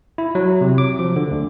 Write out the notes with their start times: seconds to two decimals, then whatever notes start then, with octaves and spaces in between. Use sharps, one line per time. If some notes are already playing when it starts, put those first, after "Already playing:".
0.18 E4
0.35 F#3
0.61 C3
0.78 D6
0.99 F3
1.16 D3
1.31 D2